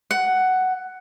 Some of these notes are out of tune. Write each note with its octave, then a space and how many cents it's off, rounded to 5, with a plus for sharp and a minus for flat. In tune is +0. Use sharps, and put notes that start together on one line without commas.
F#5 +10